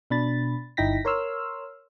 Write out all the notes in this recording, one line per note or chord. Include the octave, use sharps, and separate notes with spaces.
B2 D4 B5 A6
G1 D#4 E4 G5 A#6 B6
A#4 C#5 C6 E6 F6